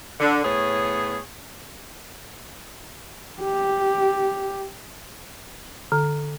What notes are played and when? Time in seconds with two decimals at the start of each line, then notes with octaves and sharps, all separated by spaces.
0.20 D3
0.44 A2 B3 G#4 C#5
3.42 G4
5.92 D3